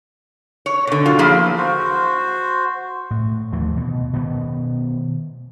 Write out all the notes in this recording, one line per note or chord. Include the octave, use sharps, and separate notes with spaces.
C#5
B2 D3
F#3 F4
E2 F3 A#3 E4 G#4
F#4 C5
A2
D#2 E3 F3 A3
B2
B2 D#3 B3